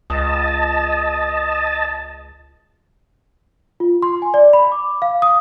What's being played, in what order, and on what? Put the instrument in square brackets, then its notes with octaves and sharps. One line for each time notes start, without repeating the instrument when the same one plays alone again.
[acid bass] C#2 [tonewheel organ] D#5 A5
[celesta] F4
C6
G#5
D5
B5
D6
F5
D#6